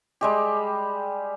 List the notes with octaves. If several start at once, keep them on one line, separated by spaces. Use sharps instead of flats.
G3 G#3 G4